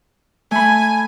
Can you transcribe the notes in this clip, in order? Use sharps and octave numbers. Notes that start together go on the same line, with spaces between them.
A3 G#5 B5